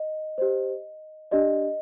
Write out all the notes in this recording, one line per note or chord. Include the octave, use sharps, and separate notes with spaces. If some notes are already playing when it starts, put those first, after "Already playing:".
Already playing: D#5
G4 C5
D4 G4 D5 D#5